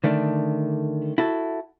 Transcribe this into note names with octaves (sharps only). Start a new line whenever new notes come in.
D3 D#3 A3 D4
E4 F#4 A4